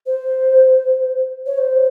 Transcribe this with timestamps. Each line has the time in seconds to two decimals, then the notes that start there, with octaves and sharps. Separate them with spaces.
0.06 C5
1.46 C#5
1.58 C5